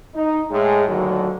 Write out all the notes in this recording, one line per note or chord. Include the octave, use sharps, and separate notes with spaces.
D#4
A2 G#3 G#4
D2 A#2 D3 D#3 F#3